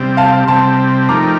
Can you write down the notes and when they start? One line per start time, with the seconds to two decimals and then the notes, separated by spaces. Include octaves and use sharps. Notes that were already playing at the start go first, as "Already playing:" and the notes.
Already playing: C3 G3 C4
0.17 F5 A5
0.48 C3 G3 C4 A5 C6
1.09 F3 A3 D#4 G4 A#4 A#5 D6